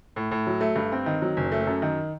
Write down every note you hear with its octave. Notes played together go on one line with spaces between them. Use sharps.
A2
A2
F#3
A3
G2
C4
D#3
F#3
F#1
A3
F#2
D#3